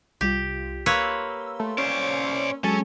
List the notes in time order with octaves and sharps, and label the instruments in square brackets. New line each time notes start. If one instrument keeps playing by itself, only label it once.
[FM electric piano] C2 G3 F4 [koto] G4
[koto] A#3 B4 C#5 [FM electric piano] C6 E6
[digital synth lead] A3
[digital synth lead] C#4 [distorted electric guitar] C5 D5
[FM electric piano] F#3 G#3 [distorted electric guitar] C#4 [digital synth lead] A4